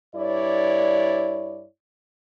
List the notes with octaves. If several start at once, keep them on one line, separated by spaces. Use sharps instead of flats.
G2 E4 C#5 D5